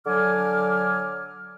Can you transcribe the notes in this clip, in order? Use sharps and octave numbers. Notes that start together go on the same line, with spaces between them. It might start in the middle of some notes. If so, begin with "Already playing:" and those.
D3 F#3 G#5 D6 F6